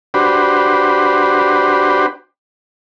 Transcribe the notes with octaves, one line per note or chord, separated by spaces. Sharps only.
D4 F#4 G4 B4 C5